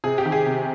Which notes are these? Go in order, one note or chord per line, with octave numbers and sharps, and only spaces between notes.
C3 G#4
G4
D#3
G#4
C3